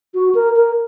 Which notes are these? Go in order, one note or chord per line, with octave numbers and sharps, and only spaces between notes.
F#4
A#4
A#4